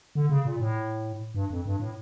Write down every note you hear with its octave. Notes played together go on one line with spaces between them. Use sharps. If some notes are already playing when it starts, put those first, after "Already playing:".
D3
C#3
A#2
A2
G2
F2
G2
A2